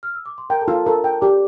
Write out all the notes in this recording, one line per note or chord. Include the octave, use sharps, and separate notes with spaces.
F6
E6
D6
C6
A#4 G5 A#5
A4 A5
F4
A4 A5
A4 A#4 A#5
G5
G4 D5 D6